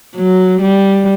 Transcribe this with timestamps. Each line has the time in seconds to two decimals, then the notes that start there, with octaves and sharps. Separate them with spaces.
0.17 F#3
0.62 G3